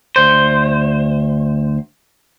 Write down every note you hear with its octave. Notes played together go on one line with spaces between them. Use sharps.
D2 C5